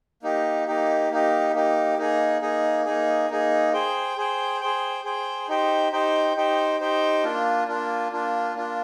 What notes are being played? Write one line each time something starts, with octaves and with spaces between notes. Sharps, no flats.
A#3 D#4 G4
A#3 D#4 G4
A#3 D#4 G4
A#3 D#4 G4
A#3 D#4 G#4
A#3 D#4 G#4
A#3 D#4 G#4
A#3 D#4 G#4
G#4 C5 G5
G#4 C5 G5
G#4 C5 G5
G#4 C5 G5
D#4 G4 C5 G5
D#4 G4 C5 G5
D#4 G4 C5 G5
D#4 G4 C5 G5
A#3 D4 F4
A#3 D4 F4
A#3 D4 F4
A#3 D4 F4